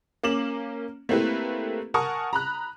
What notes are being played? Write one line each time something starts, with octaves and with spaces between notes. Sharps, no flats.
A#3 C#4 D6 E7 F#7
A3 A#3 C4 E4 G4 B4
A#4 F#5 G#5 A5 C#6 D#6
A#5 B5 F#6